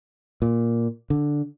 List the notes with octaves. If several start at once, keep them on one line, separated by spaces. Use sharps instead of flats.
A#2
D3